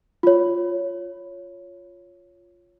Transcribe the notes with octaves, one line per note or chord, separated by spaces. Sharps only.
F4 C#5